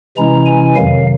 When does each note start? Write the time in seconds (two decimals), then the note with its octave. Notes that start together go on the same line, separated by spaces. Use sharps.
0.17 C3 E3 G#3 C#4 E4 A#5
0.46 G#5
0.76 F2 C3 D#3 F#3 F5